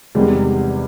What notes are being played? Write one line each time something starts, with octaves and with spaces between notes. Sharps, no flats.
E2 C3 D#3 G3 G#3